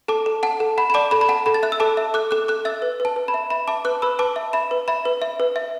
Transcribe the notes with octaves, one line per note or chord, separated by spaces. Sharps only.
A4 A5 D6
A4
F#5 A5
A4
F#5 B5
B5
D5 A5 D6
A4 B5
B5
F#5 A5
A4 B5
A6
E5 F#6
E6
A4 A5 D6
E5
A4 D6 F#6
A4 D6 F#6
A4 D6 F#6
E5 E6 A6
B4
B4
A5
B4
B5
E5
E5 B5
E5 A5 D6
B4 D6 F#6
B4 B5 E6
B4 A5 D6
E5
E5 B5
B4
E5 B5
B4
E5
B4
E5